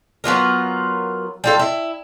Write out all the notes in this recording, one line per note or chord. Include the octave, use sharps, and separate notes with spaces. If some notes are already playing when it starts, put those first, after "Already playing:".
F#3 B3 F4 A#4
G3 F4 A4
E4